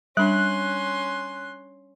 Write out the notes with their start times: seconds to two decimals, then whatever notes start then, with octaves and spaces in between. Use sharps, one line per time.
0.17 G3 C#4 D4 C6 F#6